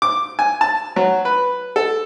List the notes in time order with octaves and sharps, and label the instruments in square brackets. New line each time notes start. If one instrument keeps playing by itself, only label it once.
[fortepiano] D6
G#5
A5
F#3
B4
A4